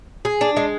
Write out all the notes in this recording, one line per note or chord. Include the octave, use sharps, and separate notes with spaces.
G#4
D4
G#3